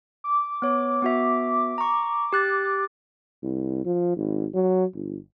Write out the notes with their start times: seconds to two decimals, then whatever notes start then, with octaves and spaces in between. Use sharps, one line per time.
0.24 D6
0.62 B3 C#5
1.02 B3 F#4 E5
1.78 A#5 C#6
2.33 G4 F#6 A6
3.43 C2
3.85 F3
4.16 G#1
4.54 F#3
4.94 G1